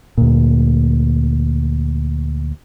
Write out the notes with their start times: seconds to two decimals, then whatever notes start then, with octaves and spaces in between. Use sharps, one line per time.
0.18 D2 A#2